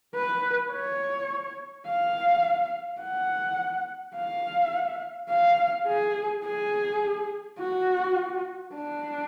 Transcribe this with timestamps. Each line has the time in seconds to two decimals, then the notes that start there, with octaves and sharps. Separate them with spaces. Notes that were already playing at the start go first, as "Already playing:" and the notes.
0.15 B4
0.72 C#5
1.87 F5
3.01 F#5
4.16 F5
5.30 F5
5.87 G#4
6.45 G#4
7.59 F#4
8.74 D4